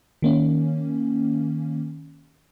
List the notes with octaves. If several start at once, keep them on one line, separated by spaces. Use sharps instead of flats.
D#3 A#3 C#4